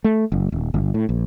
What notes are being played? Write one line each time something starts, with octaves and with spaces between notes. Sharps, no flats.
A3
F#1
D#1
G1
A2
A#1